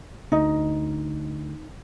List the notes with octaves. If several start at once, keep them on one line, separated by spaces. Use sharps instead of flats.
D2 D#4 D#5